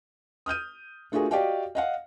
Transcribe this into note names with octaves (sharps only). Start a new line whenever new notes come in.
D#6 F6 G6 D#7
A3 D4 F4 F#4 G#4 A#4
F#4 G4 D5 D#5 F5 G5
D#5 F5 F#5